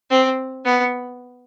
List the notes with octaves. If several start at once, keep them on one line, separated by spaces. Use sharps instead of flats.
C4
B3